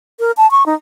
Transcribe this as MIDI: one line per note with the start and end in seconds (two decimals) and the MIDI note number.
0.20 0.32 70
0.37 0.50 81
0.51 0.66 85
0.66 0.74 63